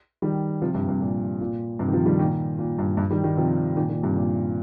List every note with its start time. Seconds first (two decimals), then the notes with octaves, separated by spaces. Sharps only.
0.22 D#3 G3
0.62 C3 F3
0.74 G2 C3
0.88 G2 C3
1.01 A#2
1.41 A#2
1.79 G2 C3
1.88 D#3
1.93 C3 F3
2.06 D#3 G3
2.19 A#2 D#3
2.59 A#2
2.79 G2
2.97 G2
3.10 D#3 G3
3.24 D#3 G3
3.37 C3 F3
3.76 A#2 D#3
3.89 A#2 D#3
4.02 G2 C3
4.16 A#2